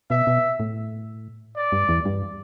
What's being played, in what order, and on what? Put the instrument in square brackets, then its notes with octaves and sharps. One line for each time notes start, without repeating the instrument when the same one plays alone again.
[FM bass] B2 [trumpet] E5
[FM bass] B2
A2
[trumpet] D5
[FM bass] G2
E2
G2